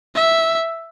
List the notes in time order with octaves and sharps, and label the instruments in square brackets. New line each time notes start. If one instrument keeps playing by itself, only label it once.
[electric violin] E5